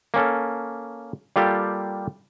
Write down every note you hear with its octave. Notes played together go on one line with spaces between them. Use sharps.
A#3 C#4 A4
G3 A#3 F4 G4 A4